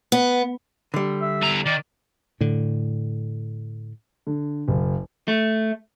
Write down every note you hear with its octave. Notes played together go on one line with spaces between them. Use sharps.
B3
D3 G3
E5
E2 A#5
D#3 D5
A2 D3
D3
F#1
A3